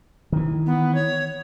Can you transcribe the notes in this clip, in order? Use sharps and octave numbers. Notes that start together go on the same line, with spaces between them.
D#3 E3
B3
C#5